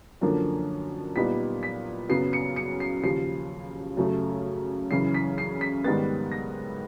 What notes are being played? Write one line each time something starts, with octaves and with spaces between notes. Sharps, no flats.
F#2 D3 F3 A#3 D4
A#2 G3 B3 D#4 B6
B6
F#2 C#3 F#3 B3 C7
C#7
C#7
C7
D#2 C#3 F3 C7
F#2 C#3 F#3 A3
F#2 C#3 E3 C7
B6
C7
B6
G#2 D#3 G3 B3 A6
A#6